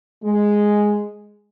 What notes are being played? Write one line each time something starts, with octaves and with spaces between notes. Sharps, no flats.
G#3